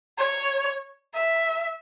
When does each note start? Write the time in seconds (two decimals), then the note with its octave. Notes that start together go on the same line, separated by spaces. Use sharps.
0.18 C#5
1.14 E5